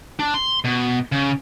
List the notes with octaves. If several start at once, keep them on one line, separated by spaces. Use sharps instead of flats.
D4
C6
B2
C#3